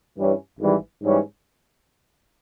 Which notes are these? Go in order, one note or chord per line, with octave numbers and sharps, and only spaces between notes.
G2 E3 G3 C#4 E4
G#1 G#2 E3 G3
G#2 E3 G3 C#4